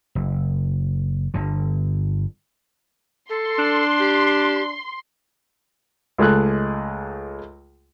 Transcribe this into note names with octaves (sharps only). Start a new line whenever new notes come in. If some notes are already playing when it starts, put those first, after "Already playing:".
F#1
G1 G2 D3
A4 C6
D4
G4
C#2 G#3 A3 G#4 F#6